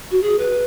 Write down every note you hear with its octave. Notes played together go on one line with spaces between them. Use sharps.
F#4
G#4
B4